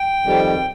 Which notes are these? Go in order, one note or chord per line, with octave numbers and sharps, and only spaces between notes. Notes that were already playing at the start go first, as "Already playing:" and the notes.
Already playing: G5
F2 D#3 G3